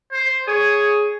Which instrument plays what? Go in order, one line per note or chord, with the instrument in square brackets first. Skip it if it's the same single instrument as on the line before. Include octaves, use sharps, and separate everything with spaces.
[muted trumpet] C5
[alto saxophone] G#4 [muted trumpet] C#5